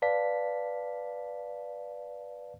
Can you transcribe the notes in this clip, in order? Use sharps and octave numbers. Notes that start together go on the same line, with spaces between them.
B4 D5 F5 A5 B6